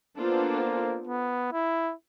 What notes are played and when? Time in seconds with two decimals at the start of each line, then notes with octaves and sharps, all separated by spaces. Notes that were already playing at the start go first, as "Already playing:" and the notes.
0.17 A#3 B3 D4 F4 A4 C5
1.07 B3
1.52 E4